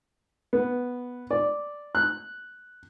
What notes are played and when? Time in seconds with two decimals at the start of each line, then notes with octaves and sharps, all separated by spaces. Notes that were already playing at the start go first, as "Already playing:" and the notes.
0.53 B3
1.31 D5
1.95 F#6